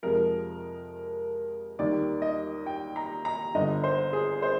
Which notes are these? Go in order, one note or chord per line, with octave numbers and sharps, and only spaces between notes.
F2 C3 F3 G#3 A#4
D#2 D#3 G3 D5
D#5
G5
A#5
A#5
G1 G2 D3 D#5
C5
G#4
C5